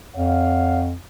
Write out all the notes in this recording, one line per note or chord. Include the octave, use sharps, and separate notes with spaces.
F2 C#5 F5 F#5